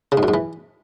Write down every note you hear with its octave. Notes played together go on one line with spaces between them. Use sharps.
C#3
G#2
F#2
G#2
E3